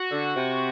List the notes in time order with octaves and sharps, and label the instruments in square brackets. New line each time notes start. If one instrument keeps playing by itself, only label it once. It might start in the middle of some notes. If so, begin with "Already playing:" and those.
Already playing: [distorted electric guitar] F#4
[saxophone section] D3
C3